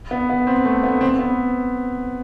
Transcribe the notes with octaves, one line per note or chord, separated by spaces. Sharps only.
B3
B3
C4
A3
B3
C4
B3